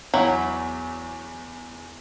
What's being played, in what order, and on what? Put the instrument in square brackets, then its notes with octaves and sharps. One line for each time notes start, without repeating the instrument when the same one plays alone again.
[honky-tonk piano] E2 [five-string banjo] F#3 E4